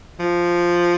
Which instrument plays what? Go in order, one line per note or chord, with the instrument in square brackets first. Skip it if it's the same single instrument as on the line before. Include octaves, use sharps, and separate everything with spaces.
[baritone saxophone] F3